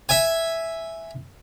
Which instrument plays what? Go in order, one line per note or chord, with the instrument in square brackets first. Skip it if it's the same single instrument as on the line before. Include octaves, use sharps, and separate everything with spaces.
[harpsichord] E5 G#5